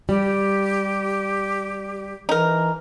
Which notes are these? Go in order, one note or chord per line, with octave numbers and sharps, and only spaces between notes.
G3 G4
E3 D#4 A#4